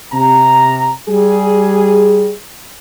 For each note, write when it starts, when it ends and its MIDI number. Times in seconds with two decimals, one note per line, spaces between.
0.12 0.90 48
0.12 0.90 82
1.09 2.32 55
1.09 2.32 68